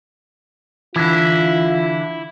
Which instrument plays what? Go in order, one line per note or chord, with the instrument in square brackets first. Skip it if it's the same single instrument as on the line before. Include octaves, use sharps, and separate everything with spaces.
[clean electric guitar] D3 E3 [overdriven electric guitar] E4 [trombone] F4